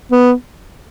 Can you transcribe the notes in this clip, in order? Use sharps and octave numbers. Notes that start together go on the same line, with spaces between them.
B3